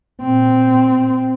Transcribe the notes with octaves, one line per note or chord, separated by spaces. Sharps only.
A#2 C4